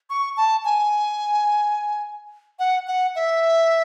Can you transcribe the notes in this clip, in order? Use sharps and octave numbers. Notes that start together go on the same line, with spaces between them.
C#6
A5
G#5
F#5
F#5
E5